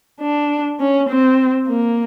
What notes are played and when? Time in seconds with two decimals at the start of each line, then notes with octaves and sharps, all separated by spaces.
0.21 D4
0.80 C#4
1.09 C4
1.68 A#3